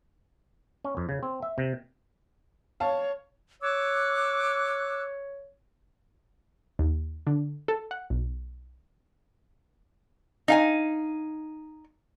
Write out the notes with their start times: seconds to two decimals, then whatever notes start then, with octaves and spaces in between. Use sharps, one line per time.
0.85 C#4
0.97 F2
1.09 C#3
1.23 C4
1.42 E5
1.58 C3
2.80 C#5 F5 A5
3.62 C#5 D6 E6 F#6
6.79 D#2
7.27 D3
7.68 A4
7.91 F#5
8.10 B1
10.48 D#4 F5 G#5